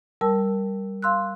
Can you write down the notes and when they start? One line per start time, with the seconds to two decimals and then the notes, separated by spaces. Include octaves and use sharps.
0.21 G3 A#4 A5 E6
1.02 F5 C6 E6 F#6